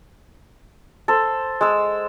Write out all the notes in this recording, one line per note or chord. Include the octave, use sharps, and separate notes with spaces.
A4 C5
G#3 E6